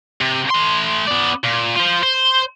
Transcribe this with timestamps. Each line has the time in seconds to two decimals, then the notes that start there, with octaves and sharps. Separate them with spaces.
0.21 C3
0.50 A3 C6
1.07 B3 D5
1.44 A#2
1.76 F4 C5
2.03 C5